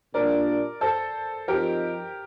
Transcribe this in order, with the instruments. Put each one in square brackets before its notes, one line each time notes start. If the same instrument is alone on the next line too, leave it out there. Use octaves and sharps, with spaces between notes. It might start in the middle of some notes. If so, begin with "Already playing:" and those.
[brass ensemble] A#2 G3 D4 [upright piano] A#4 D5
[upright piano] A4 C5
[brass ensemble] F3 C4 D#4 [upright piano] G4 A#4